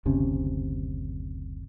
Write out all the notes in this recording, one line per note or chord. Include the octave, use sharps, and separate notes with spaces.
F#1 D2 C3 C#4